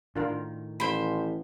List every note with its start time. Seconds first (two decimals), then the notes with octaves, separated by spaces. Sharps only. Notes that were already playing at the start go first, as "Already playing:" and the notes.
0.16 A2 D#3 D4 F4 A#4
0.80 A1 C5 B5